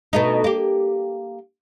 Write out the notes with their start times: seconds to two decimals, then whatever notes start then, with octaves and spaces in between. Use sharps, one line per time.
0.13 B2 A3 D#4
0.44 A#3 G4